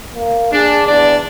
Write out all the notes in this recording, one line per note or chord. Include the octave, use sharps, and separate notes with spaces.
A#3
D4 G#4
E2 D4 D5